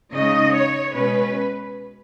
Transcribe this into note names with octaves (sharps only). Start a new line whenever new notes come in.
C#3 G#3 D#4 D#5
C#5
B2 G#3 C#4 B4